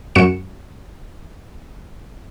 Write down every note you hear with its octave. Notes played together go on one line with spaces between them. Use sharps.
F#2 F#4 C#7 E7